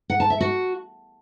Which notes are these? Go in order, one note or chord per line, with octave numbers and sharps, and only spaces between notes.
F#5
A5
E5
F#4